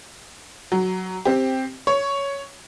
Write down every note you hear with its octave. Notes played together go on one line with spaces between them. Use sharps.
F#3
C4 G4
C#5